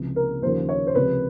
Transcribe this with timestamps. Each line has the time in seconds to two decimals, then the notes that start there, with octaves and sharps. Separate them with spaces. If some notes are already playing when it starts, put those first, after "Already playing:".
Already playing: C#2 C3 F3
0.16 A#4
0.42 D#2 C#3 F3 C5
0.69 C#5
0.87 C5
0.95 C#2 C3 F3 B4